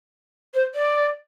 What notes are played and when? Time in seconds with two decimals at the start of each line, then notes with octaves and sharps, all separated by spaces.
0.54 C5
0.75 D5